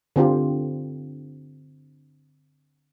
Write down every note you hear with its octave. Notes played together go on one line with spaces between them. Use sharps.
D3 C4 F4 G4